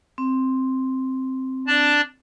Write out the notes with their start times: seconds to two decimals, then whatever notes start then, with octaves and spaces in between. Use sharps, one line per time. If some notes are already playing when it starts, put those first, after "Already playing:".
0.18 C4
1.67 D4 D5 A5